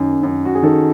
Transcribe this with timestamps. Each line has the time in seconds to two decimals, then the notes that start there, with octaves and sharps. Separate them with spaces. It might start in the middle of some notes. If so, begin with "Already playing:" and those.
Already playing: F#2 D#3
0.23 F#2
0.45 F#4
0.55 G#4
0.63 D#3 A4